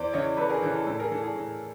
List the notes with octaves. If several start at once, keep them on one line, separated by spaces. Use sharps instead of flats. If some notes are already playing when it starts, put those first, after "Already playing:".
Already playing: E2 C5 D5
C#3 E3 C#5 D#5
E2 A4 B4
G#4 A#4
C#3 E3 A4
A4
A2 A4
G#4 A#4
E3 A4
G#4
A2